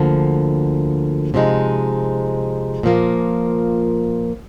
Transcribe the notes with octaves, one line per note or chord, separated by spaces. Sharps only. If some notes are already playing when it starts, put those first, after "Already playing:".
Already playing: D2 D3 F3 A#3
C3 F3 G#3 C4 D#4
A#2 F3 A#3